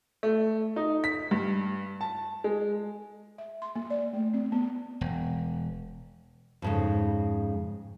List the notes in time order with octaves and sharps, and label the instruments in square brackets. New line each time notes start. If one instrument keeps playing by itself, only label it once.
[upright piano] A3
D#4
B6
G2
A5
G#3
[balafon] E5
C6
A#3
D5
A3
C4
B3
[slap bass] E1
[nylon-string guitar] F2 G#2 C#3